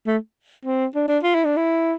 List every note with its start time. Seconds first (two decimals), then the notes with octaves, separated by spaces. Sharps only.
0.07 A3
0.65 C4
0.95 D4
1.08 D4
1.23 F4
1.35 E4
1.45 D4
1.57 E4